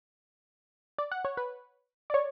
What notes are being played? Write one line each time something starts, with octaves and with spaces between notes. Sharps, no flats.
D5
F#5
C#5
B4
D5
C#5